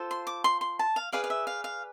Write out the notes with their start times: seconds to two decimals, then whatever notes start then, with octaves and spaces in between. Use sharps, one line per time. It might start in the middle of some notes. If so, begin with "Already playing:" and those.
Already playing: F4 A4 C5
0.11 C6
0.27 D6
0.44 C6
0.61 C6
0.79 A5
0.96 F5
1.13 G#4 B4 D5 F5
1.24 F5
1.30 E5
1.47 F5
1.64 F5